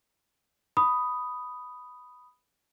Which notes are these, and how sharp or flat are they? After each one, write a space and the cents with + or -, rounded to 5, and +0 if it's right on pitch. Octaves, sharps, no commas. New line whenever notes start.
B5 +5 D#6 +0